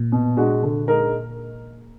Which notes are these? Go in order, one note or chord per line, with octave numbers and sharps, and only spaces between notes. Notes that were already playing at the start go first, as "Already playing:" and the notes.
Already playing: A#2
B2
G#3 D4 F#4
D3
G#3 D#4 A#4